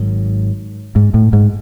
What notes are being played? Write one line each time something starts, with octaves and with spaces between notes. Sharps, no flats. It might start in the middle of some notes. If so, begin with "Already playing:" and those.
Already playing: G#1 G#2 D#3 F#3
G#2
A2
G#2